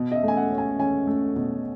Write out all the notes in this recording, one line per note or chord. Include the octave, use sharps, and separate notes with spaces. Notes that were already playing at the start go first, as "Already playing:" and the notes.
Already playing: B2
D#5
E5
A3 G#5
F#5
C#4
G#5
C#4 G#5
A3
B2